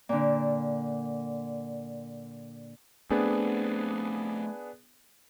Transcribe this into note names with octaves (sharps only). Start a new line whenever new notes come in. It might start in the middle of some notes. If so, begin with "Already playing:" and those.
A#2 D3
A3 B3 C4 D4 G#4